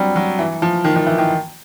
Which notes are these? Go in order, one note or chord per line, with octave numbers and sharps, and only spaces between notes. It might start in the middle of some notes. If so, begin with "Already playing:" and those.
Already playing: F#3 G3 C4 D4
F#3
E3
F3
D#3
D#3
E3
D#3